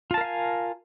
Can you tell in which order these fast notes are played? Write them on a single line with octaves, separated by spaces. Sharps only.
F4 A5 A#4 F5 G#5